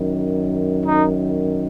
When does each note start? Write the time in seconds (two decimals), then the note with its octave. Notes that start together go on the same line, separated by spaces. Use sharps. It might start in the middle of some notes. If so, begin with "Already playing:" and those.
Already playing: F#2 D#3
0.85 D#4